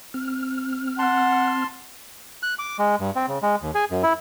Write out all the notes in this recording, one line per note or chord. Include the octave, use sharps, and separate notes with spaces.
C4 F6
F#5 A5 C6
F#6
D6
G#3
G2
C4
C#3
G#3
D#2
G#4
F#2
E4